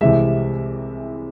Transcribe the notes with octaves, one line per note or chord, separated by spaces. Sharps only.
C2 C3 E3 G#3 E5